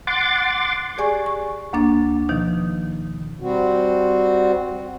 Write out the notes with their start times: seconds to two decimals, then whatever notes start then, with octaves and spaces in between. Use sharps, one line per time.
0.07 F#5 C6 D6 A6
0.98 G4 G#4 D5 G#5 C#6
1.26 C#6
1.73 D2 A#3 D4 A6
2.29 B2 D#3 F3 D#4
3.41 G3 C4 F#4